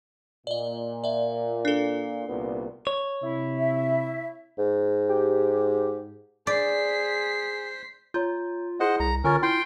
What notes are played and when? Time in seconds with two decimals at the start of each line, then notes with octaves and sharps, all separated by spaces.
0.47 A#2 D5 D#5
1.04 D5 E5
1.65 D4 A4
2.28 C2 A#2 B3
2.87 C#5
3.23 C3 E4
3.57 E5
4.58 G#2
5.09 G4
6.47 G#4 C5 D5 B6 C7
8.14 F4 C#5 A#5 G6
8.80 E4 G#4 C5 D#5 F#5 C#7
9.00 C2 A#5
9.24 D3 C#4 F4 A#4 F6 A6
9.43 E4 G5 C6